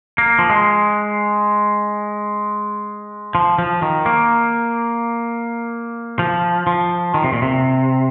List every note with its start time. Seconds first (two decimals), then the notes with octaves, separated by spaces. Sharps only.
0.18 A#3
0.39 F3
0.50 G#3
3.35 F3
3.58 F3
3.82 D#3
4.06 A#3
6.19 F3
6.67 F3
7.14 D#3
7.24 C3
7.33 A#2
7.42 C3